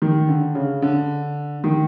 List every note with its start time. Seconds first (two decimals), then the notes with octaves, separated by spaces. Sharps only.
0.02 D#3
0.29 D3
0.55 C#3
0.82 D3
1.64 D#3